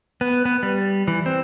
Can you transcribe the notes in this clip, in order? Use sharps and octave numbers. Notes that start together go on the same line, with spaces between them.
B3
B3
G3
E3
C4